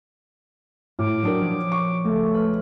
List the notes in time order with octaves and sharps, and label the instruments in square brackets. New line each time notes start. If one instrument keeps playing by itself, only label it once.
[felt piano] A2 [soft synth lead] D6 [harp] F6
[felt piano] F#3 D4 A#4 [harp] G5 D#6
[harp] A#2 F3 C#4
[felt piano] C#6
[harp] C#2 [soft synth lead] A3
[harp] B4 F6